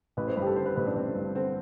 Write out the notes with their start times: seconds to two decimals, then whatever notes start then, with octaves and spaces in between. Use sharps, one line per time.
0.17 A1 B4
0.27 C5
0.36 G2 B4
0.42 G4
0.47 A4
0.56 D3 C5
0.66 B4
0.76 A1 B4
0.86 D4
0.96 A1 C4
1.15 G2
1.35 D3 C4